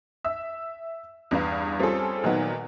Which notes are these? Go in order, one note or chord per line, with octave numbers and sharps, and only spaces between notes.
E5 E6
E2 G2 B4 F5
G3 C4 C#4 F4 G#4 A4
A#2 D#3 F#3 B3